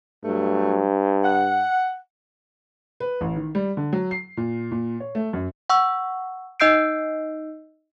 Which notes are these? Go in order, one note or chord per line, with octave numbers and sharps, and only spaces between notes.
G2 F#3 A3
F#5
B4
A1
D#3
G3
D3
F#3
C7
A#2
A#2
C#5
A3
F#2
F#5 C#6 E6
D#4 D#5 E6 G6 C7 D7